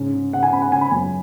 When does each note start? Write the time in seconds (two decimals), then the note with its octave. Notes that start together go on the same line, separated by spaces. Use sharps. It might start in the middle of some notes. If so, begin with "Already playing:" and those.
Already playing: G#2 C#3 C#4
0.14 C#3
0.33 C#3 F#5
0.43 G#5
0.52 C#3 B5
0.62 F#5
0.72 C#3 G#5
0.81 B5
0.91 F#2 G#5